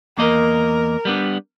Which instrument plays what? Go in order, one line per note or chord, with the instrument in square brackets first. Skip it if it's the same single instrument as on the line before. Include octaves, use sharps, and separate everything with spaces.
[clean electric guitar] E2 A#3 D#5 [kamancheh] A#4
[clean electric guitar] G3 B3 D4